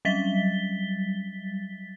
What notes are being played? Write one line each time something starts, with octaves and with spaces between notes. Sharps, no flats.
F#3 G3 A6 B6 G7